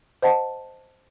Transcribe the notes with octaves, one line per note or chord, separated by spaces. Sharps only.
C5 D#5 F#5 A5